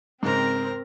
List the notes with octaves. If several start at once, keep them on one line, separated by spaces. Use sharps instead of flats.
G#2 C#3 C4 A#4 A#5